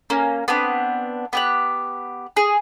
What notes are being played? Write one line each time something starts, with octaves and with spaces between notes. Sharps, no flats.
A#3 C#4
B3 C4 D4
B3 G4 F#6
G#4